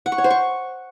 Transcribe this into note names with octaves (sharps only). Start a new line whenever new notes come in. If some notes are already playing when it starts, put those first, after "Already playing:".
F#5
C#6
C#5
C5
C#6